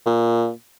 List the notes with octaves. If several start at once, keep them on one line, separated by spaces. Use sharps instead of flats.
A#2